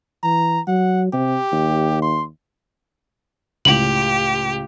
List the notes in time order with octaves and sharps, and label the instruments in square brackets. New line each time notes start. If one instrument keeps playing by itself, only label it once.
[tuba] E3 [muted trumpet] A#5
[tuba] F#3 [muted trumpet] F#5
[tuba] C3 [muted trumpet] G4
[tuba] D#2
[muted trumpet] C6
[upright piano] C#2 A2 [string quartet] G4 [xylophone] F#7